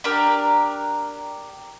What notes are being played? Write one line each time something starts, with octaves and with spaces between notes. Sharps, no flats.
D4 G4 A#4